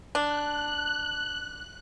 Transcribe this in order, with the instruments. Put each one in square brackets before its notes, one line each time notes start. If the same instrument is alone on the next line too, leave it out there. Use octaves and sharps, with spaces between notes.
[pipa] D4 [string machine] F#6